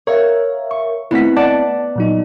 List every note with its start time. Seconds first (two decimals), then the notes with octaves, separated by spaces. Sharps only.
0.07 A#4 C#5 E5 F5
0.71 C#6
1.11 A3 B3 C4 E4 F#5 B6
1.36 D5 F#5 A5
1.96 A#2 F#3 D#4